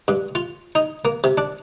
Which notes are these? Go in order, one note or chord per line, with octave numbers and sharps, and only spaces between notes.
G2
F4
D#4
A#3
C3
D4